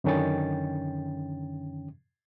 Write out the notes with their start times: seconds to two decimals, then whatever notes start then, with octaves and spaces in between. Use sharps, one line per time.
0.04 F#2 D3 D#3 C#4 G5 A6